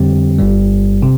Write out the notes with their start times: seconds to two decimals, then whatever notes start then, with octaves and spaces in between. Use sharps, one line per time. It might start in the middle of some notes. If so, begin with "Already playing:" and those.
Already playing: F2 D3 G3 C4 G4
0.39 G1 G2 G3
1.02 C3